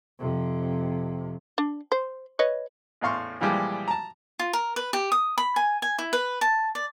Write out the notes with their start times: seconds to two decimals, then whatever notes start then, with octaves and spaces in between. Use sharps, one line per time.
0.19 F2 C3
1.58 D4
1.92 C5
2.39 B4 C#5 D#5
3.01 A1 E2 A2 F5 C6 C#6
3.41 A#2 E3 F3 G3 G#3 G4
3.88 A5 A#5
4.39 F4
4.53 A#4
4.76 B4
4.93 G4
5.12 D#6
5.38 B5
5.56 G#5
5.82 G#5
5.99 E4
6.13 B4
6.41 A5
6.75 D5